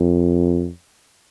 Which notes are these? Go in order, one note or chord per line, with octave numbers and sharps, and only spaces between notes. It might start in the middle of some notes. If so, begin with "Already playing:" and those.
Already playing: F2